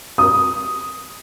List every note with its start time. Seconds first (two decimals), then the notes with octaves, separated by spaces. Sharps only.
0.18 D#6